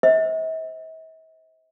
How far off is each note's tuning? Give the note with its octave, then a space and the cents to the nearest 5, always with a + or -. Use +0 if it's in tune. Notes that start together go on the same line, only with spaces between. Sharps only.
C5 +0 E5 -45